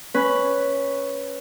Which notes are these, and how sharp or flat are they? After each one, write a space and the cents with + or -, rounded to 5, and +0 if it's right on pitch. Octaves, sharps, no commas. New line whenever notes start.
C#4 +0 B4 +0